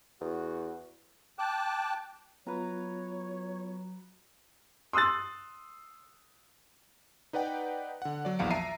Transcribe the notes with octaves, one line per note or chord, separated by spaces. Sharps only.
E2 F#4
G5 A5 D6 F#6
F#3 B3 F4 B4 C#5 A#5
C6 D#6 E6 F#6 A6
D#4 B4 D5 F#5 G5
D3 F#5
F#3 D5
A#1 E2 F5 C#7 D7
E5 A5 A#5 A#6 C7 D#7